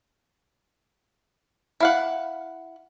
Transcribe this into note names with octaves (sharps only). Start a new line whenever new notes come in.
E4 F5 F#5